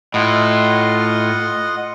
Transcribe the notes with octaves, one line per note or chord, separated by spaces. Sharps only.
A2 F4 D#5 F#5